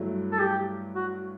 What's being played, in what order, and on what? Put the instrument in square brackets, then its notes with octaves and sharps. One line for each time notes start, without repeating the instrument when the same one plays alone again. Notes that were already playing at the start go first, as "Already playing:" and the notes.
Already playing: [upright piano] G2 F#3 A3 E4
[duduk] A4
G4
F#4